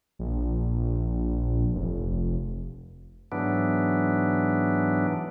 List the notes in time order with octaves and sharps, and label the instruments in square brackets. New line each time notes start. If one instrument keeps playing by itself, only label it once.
[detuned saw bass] A#1
F1
[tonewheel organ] G#2 E3 F#3 B3 D4